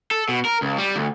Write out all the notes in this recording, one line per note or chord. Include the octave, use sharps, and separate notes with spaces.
A4
B2
A#4
C#2
G3
D2